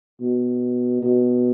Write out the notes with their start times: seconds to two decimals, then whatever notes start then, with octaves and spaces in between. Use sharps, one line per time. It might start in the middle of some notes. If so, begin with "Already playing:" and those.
0.21 B2
1.03 B2